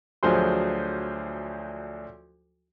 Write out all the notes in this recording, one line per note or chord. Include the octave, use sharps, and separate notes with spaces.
D2 F3 F#3 G#4 C5 C6